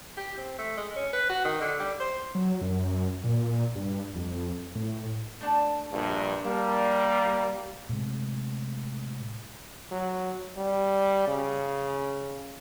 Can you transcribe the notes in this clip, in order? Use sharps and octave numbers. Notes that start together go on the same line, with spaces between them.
G4
C4
A3
G#3
C#4
B4
F#4
D#3
D3
G3
C5
F#3
F#2
A#2
G2
F2
A2
A3 D4 A5
A#1 G2
F3 G3 A#3 D4
A2 C3 G#3
F#3
G3
C#3